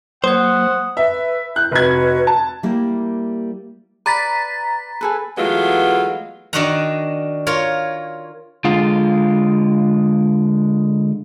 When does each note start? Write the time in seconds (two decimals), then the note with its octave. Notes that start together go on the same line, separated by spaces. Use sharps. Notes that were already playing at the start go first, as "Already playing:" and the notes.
0.24 F#3 A#3 C5 F#5 D#6 G#6
0.97 B4 E5
1.56 E4 F#6 G6
1.72 F1 F#4 B4 G#6
2.27 A5
2.63 G3 A#3 E4
4.06 B4 D5 A#5 B5 A6 B6
5.01 G#4 A4 B4
5.38 E3 F#3 G#3 A3 B3 F4
6.53 D#3 D4 F#4 D#5 F#5 A#5
7.47 F4 A#4 C#5
8.65 D3 G#3 F4